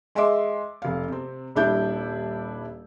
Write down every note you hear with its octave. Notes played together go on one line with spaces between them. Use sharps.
G#3 D#5 E5 C6 D6
F1 F5
C3 C4
D#1 G3 D4 E4 G6